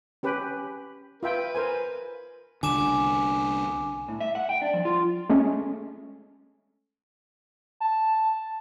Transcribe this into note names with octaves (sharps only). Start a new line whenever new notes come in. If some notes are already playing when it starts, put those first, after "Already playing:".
C#4 G4 B4
F4 B4 E5 G5
A#4 C5 G#5
C2 D3 G#5 D6 E7
A2
E5
F#5
G5
D4
F3
F4
G#3 A3 C#4
A5